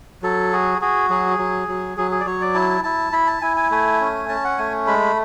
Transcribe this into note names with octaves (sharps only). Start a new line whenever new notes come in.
F#3 A4
F#4 G#4
F#4 G#4
F#3 G#4
F#3
F#3
F#3 G#4
G#4
D5
F#3 C#5
D5
E4 A5
E4 A5
E4 B5
A5
E4 G#5
G#5
A3 G#5
C#4
C#4 A5
F#5
A3 G#5
G#3 B5